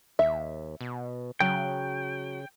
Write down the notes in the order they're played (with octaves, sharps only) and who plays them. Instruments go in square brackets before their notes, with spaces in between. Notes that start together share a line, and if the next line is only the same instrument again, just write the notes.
[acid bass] D#2 [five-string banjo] E5
[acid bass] B2
[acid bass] C#3 [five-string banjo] F#3 [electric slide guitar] G5